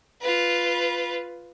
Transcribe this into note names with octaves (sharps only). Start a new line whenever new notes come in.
F4 B4